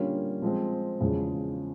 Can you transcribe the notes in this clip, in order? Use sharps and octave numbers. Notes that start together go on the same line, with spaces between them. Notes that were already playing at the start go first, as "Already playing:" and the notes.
Already playing: D3 G3 A#3 C#4 F4
F3 G#3 C4
E2 C#3 F3 G#3